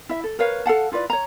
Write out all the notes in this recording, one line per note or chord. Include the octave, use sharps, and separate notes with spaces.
E4 E5
A4
A#4 B4 C#5 F5
A4 F5 F#5 A5
E4 F4 B4 D5
C#5 A#5